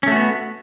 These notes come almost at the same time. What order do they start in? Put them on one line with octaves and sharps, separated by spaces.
C#4 A3 F#4 B3